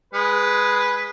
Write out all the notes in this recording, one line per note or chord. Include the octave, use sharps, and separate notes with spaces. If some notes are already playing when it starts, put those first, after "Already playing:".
G#3 B4